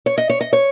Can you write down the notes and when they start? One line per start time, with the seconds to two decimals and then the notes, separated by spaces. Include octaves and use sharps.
0.06 C#5
0.18 D#5
0.29 C#5
0.41 D#5
0.53 C#5